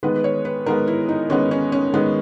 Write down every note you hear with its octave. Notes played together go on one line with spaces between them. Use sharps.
D#3 G#3 B3 B4
B4
C#5
B4
D#3 G#3 B3 A#4
E4
D#4
D#3 G#3 B3 C#4
C#4
C#4
D#3 G#3 B3